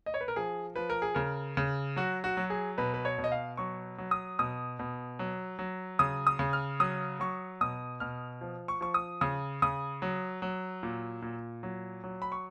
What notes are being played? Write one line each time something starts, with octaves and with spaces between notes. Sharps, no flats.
D#5
C#5
B4
A#4
F3 G#4
F3 B4
A#4
G#4
C#3 A#4
C#3
F#3 F#4
F#4
F#3
G#4
B2 B4
B4
C#5
B2
D#5
F5
F#3 C#6
F#3
D#6
B2 D#6
B2
F#3
F#3
C#3 D#6
D#6
C#3
F6
F#3 D#6
F#3 C#6
B2 D#6
B2 F6
F3
C#6
F3 C#6
D#6
C#3 D#6
C#3 D#6
F#3
F#3
A#2
A#2
F#3
F#3
B5
C#6